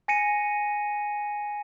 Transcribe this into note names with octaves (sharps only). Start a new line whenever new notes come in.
G#5 A#6 C#7 D#7